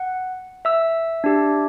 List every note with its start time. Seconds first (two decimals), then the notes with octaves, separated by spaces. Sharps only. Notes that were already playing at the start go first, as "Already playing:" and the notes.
Already playing: F#5
0.65 E5 E6
1.24 D4 G4